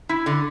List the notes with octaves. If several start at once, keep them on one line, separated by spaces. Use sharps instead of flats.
E4
D3